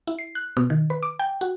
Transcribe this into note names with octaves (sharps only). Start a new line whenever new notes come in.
E4
C7
F#6
B2
D#3
B4
D6
G5
F#4